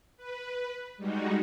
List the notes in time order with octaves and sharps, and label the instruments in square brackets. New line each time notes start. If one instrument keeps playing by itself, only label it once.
[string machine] B4
G3 G#3 D#4 F#4